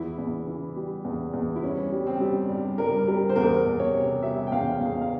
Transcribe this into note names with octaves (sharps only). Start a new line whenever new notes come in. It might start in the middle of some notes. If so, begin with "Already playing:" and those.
Already playing: E2 E4
E2
E3
G3
E2
E2
E4
G2 C#4
G3
C4
G3
G2
G2 A#4
G3 A#4
C5
E2 A#4
E2
C#5
C3
G3 E5
G5
E2 F5
E2 F5
F5